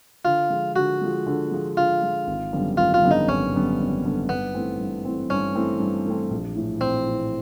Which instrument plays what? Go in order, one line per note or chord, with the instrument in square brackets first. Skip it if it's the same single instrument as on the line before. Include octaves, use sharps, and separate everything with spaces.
[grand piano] D3 [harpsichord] F4
[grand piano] F3 G#3
[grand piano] D3 [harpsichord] F#4
[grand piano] F3 G#3
D3
F3 G#3
[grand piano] D3 [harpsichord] F4
[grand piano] F3 G#3
G#1
F#2 D3 G3 B3
[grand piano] G#1 [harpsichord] F4
[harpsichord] F4
[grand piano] F#2 D3 G3 B3
[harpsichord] D#4
[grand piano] G#1 [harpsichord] C#4
[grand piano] F#2 D3 G3 B3
G#1
F#2 D3 G3 B3
[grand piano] G2 [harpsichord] B3
[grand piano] E3 A3 C4
G2
E3 A3 C4
[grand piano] G2 [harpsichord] C#4
[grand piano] E3 A3 C4
G2
E3 A3 C4
A#1
A2 E3
[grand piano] A#1 [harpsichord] C4
[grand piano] A2 E3